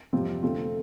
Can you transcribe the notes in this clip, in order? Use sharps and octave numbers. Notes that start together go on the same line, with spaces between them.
F2 C3 G3 C4 F4
D3 A3 C4 F4